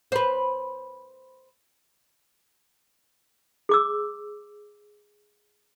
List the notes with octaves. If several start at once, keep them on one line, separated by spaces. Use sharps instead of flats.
B4 C5
G#4 D6 E6